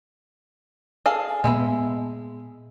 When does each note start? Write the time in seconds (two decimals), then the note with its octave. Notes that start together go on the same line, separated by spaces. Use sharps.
1.06 G#4 A4 F5
1.44 A#2 G#3 B3 E5 B5